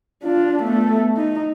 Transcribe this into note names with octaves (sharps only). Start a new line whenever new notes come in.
D4 F4
A3 B3
D#4